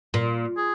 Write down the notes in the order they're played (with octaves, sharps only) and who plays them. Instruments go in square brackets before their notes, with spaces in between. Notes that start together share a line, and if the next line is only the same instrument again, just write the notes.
[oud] A#2
[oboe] G#4